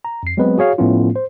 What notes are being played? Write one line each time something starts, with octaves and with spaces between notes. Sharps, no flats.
A#5
F2 C7
F#3 G#3 B3 C4 B4 D#5
F#4 G#4 C#5 F5
A2 F3 A3 B3 C#4 F4
C5